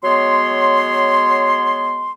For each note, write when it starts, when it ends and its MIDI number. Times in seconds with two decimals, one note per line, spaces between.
0.03 2.11 54
0.03 2.11 56
0.03 2.11 59
0.03 2.11 73
0.03 2.11 84